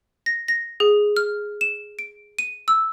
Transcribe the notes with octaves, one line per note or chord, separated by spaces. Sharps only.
A#6
A#6
G#4
F6
E7
D7
D#7
E6